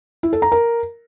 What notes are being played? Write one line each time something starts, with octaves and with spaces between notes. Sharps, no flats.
E4
A4
A#5
A#4